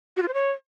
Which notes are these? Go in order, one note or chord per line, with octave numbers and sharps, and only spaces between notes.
F#4
F4
C5
C#5